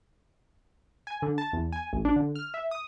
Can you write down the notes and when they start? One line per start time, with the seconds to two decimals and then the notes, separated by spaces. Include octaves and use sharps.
1.07 G#5
1.22 D3
1.38 A5
1.53 E2
1.72 G#5
1.93 A1
2.05 D4
2.16 D3
2.35 F6
2.54 E5
2.71 D#6